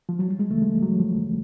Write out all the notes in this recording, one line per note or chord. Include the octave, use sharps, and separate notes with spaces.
F3
F#3
G3
G#3
D2 C#3 E3 A3
G#3
G3
F#3
F3
D2 C#3 E3